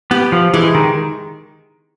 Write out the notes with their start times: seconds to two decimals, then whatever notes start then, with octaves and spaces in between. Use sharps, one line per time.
0.11 B3 G4
0.32 F3
0.54 E3 G#3
0.75 D#3